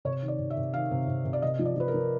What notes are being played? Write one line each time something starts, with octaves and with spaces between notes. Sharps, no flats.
C3 C#5
D#3
D5
C3
E5
C3
D#3 F5
C3
C3
C3
D5
C3 D#5
F3
D5
F3 B4
A#4
F3